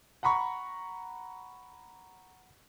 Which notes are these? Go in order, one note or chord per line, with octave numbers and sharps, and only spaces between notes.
F#5 A#5 B5 C#6